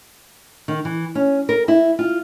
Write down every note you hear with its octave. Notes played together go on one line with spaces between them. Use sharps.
D#3
E3
C#4
A#4
E4
F4